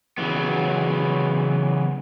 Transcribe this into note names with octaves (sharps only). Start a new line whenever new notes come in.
C#3 E3 F#3 B3